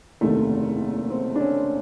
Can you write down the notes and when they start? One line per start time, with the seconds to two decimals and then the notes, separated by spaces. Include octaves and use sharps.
0.21 F#1 E2 C3 D#3 A3
1.10 C4
1.36 D4
1.40 C#4